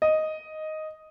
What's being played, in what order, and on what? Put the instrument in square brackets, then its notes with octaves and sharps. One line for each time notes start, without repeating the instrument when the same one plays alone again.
[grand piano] D#5